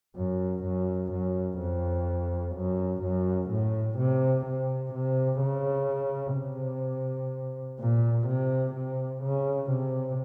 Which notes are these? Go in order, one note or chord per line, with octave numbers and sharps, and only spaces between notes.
F#2
F#2
F#2
F2
F#2
F#2
A2
C3
C3
C3
C#3
C3
A#2
C3
C3
C#3
C3